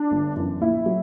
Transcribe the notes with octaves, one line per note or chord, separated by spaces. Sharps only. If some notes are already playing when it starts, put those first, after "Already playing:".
Already playing: D4
G1
F#2 E3
A#1 E4
F#3